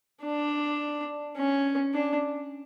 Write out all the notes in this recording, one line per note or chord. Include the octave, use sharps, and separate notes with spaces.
D4
C#4
D4